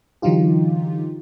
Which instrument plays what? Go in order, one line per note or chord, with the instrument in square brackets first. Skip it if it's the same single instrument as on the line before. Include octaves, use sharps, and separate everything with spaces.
[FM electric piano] D3 E3 F#3 D#4 F4 G4